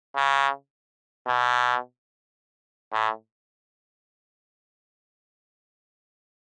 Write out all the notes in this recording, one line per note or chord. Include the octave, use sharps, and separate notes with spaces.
C#3
B2
A2